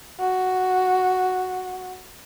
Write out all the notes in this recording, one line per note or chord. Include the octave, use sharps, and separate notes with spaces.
F#4